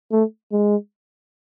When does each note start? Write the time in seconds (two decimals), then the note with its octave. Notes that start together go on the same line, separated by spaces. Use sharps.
0.11 A3
0.52 G#3